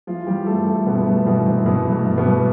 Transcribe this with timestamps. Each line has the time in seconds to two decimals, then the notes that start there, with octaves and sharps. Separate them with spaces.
0.07 E3 F3 F4
0.27 E3 G3 G4
0.47 G2 A3 A4
0.66 G2 A3 A4
0.86 G2 B2 B3
0.98 B3
1.07 G2 A3
1.26 B2 E3 B3
1.45 G2 C3 C4
1.66 B2 E3 B3
1.86 G2
1.92 A3
2.05 G2
2.18 B2 B3
2.25 G2